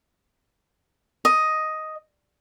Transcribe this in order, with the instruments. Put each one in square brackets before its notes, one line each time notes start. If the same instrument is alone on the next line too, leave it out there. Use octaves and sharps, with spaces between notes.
[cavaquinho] D#5